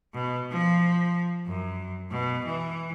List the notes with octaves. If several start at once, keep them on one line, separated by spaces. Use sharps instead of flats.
B2
F3
F#2
B2
E3